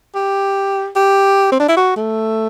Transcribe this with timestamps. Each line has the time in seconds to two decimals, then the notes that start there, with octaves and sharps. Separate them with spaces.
0.15 G4
0.96 G4
1.52 C4
1.60 D4
1.68 E4
1.77 F#4
1.97 A3